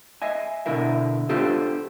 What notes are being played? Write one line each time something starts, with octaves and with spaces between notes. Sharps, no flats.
D#5 E5 G#5
B2 D3 E4 A#4 E5
B3 D4 F4 G4 A4 C5